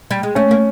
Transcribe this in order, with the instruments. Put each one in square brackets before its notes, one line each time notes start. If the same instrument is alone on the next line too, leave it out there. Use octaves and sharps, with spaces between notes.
[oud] G3
G#3
[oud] A3 [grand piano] C#4
[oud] A#3